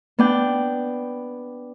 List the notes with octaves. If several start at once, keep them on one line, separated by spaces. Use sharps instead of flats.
B3 D4 G5